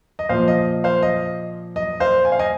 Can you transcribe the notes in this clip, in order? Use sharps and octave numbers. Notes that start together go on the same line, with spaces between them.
D#5
A#2 F3 C5 F5
D#5
C5 F5
D#5
D#5
C5 F5
G#5
F5
D#5 G#5